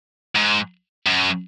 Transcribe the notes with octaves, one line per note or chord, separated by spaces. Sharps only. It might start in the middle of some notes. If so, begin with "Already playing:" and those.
G#2
F#2